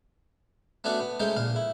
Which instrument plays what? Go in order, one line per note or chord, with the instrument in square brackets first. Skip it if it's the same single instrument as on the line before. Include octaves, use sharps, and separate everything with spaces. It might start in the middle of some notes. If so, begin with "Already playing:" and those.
[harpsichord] A3 B3 C#4 D4 F#4 D5
B3
G#3 A3 C#4 D#4 C5
A#1 A#2 F5
E4